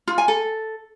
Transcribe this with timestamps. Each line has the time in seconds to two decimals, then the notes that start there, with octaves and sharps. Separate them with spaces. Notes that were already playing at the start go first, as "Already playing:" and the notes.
0.08 F4
0.18 G#5
0.28 A4